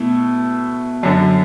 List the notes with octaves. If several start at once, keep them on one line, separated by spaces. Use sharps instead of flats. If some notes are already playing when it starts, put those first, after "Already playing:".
Already playing: B2 A3 E4
F#2 D3 F#3